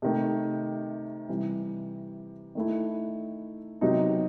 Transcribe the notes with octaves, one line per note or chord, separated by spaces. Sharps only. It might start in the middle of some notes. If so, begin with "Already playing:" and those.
C3 D#3 A3
C3 E3 G3
D#3 A3 E4
C3 D#3 F#3 B3 D#4